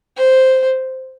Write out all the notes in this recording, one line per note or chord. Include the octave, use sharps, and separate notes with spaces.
C5